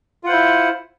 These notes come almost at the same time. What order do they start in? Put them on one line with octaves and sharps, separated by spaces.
F4 F#5 C5 E4